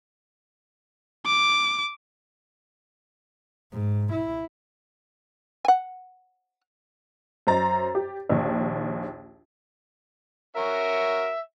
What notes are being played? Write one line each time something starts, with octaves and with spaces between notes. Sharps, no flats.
D6
G#2
E4
F#5 G#5
F#2 C5 A#5 A6
G4
A#1 D#2
C#4 F#4 A#4 E5